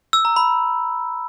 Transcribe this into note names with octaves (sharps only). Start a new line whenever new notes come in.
E6
A#5
B5